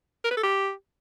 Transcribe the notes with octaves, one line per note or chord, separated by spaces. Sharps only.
A#4
B4
A4
G4